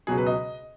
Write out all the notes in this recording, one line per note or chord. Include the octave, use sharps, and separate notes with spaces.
C#2 B2 F#3 G#4
B4
D#5